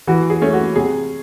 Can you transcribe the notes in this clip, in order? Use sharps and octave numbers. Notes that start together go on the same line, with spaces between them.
E3 F#4
G#4
A3 C#4
F#4
C3 G#4